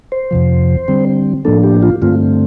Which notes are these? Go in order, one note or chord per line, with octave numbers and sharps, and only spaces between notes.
C5
F2 C3 F3
D3 G3 C4
A2 F3 A#3 D4 A4
G4
F4
G2 D3 A3 C4 F4